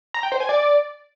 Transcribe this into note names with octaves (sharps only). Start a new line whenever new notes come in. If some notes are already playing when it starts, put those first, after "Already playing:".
A#5
G5
C5
G#5
D5